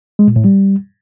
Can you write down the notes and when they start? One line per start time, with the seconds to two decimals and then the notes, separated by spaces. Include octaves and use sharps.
0.19 G#3
0.28 A#2
0.36 A2
0.44 G3